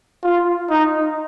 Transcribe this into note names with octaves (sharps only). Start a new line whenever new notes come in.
F4
D#4